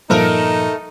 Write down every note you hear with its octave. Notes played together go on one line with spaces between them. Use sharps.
G2 A#2 F3 A3 D#4 A4 A#4